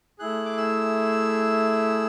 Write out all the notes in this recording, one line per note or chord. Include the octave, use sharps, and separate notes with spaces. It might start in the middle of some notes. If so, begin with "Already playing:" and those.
A3 E4 G#4 F#6
D6
E6